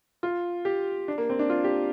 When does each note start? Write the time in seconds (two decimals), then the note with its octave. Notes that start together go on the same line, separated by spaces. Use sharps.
0.23 F4
0.65 G4
1.08 D4
1.18 A#3
1.30 C4
1.39 D4
1.50 F4
1.64 G4